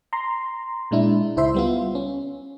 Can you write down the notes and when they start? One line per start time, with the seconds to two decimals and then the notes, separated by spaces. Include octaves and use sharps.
0.13 A#5 C6
0.91 A#2 G#3 D4 E4
1.37 C#2 E4 C5 E5 C6
1.54 G3 B3 F4
1.95 C#4